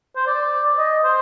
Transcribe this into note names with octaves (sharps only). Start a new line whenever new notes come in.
C5
D5
D#5
C5